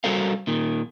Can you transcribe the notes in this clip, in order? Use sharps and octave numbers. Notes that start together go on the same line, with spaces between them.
G3 F#4 A4 A#4 C5 F5
A#2 D#3